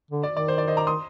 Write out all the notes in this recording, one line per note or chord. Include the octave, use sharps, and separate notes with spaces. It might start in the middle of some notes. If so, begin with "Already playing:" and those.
D3
D5
D#3
D5
C5
D5
C5 D#5
A#5 D6
C6 D#6